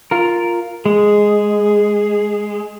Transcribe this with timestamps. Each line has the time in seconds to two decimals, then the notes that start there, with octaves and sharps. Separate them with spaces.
0.11 F4 A#4
0.86 G#3 G#4